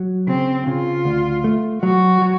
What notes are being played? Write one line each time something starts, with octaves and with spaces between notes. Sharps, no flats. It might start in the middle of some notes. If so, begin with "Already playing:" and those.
Already playing: F#3
C#3 C4
C#3 F4
D2
A3
F#3 F#4
F#3